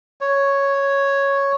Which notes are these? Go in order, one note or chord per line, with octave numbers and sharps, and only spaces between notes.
C#5